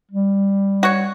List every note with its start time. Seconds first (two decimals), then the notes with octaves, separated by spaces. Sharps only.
0.12 G3
0.83 F#4 C#5